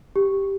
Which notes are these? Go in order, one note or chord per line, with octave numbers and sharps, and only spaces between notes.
G4